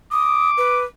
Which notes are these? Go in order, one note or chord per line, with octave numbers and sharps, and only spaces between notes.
D6 D#6
B4